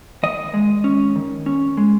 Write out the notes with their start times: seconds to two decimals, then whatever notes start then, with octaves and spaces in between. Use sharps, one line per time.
0.23 D#3 D#5
0.54 G#3
0.84 C#4
1.16 D#3
1.46 C#4
1.77 G#3